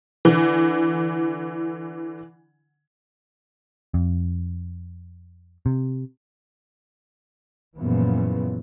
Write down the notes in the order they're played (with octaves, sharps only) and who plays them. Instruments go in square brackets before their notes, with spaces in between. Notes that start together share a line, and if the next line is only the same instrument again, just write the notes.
[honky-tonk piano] D3 E3
[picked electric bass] F2
C3
[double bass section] F#2 A#2 C#3 E3 F3 B3